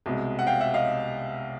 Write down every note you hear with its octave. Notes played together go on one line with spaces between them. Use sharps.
C2 B2 G#3
F#5
F5 G5
E5 F#5
D#5 F5